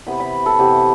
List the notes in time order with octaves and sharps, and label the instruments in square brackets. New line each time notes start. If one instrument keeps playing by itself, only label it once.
[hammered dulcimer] C3 E3 B3 B5
B5
A4
C3 E3 B3 G4